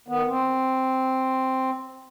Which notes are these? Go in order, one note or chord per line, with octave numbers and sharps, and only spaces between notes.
D#3 B3
C4